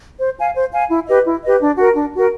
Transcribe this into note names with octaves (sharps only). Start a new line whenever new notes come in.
C5
F5 G#5
C5
F5 G#5
E4
G4 B4 D#5
E4
G4 B4 D#5
D4
F#4 A#4
D4
F#4 A#4